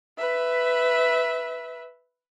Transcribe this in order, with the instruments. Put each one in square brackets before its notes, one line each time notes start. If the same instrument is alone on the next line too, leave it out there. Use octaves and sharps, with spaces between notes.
[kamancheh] B4 E5